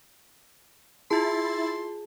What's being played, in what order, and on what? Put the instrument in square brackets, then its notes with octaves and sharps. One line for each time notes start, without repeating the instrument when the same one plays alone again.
[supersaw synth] E4 A6 [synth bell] F4 A5 [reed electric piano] G#4 [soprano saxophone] C6